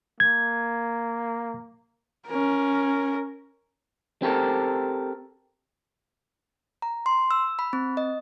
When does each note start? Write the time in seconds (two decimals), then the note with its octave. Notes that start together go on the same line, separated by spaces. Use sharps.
0.20 A#3 G#6
2.27 C#4 A#4
4.22 C4 G4 A4 A#4
6.82 A#5
7.06 C6
7.31 E6
7.59 B5
7.73 C4
7.97 D#5